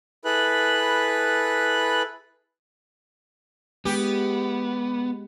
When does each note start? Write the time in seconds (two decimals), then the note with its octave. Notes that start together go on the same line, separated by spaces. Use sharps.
0.25 E4 G#4 A4 B4 B5 F#6
3.85 G#3 B3 G4